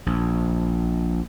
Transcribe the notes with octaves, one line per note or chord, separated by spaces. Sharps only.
A#1